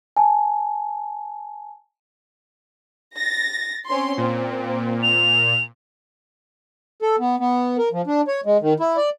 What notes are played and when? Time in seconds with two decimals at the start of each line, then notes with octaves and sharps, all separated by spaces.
0.17 G#5 A5
3.16 A6 A#6
3.87 C4 C#4 C6
4.17 A#2 C4
5.03 F7
7.02 A4
7.20 B3
7.39 B3
7.78 A#4
7.92 F3
8.07 D4
8.28 C#5
8.45 G#3
8.61 D#3
8.80 E4
8.97 D5